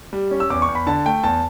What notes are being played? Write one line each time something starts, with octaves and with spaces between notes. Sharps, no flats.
G3
C#4
E6
E2 D6
C#6
E2
B5
D3 A5
A3 G5
E2 A5